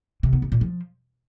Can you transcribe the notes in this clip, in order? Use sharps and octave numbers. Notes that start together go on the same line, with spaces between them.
C3
B3
C3
A#2
F3